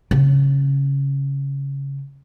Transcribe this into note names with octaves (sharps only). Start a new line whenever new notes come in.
C#3